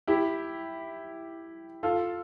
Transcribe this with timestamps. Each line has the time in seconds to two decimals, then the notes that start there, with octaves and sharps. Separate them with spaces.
0.08 E4 G4
1.83 F4 A4